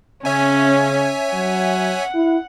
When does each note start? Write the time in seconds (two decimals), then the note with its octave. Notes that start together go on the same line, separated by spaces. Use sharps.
0.25 C#3 C#4 C#5 E5 G#5
1.33 F#3 F#5
2.15 E4